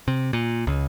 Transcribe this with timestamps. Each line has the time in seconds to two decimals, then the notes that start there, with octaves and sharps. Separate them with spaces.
0.08 C3
0.33 A#2
0.67 C#2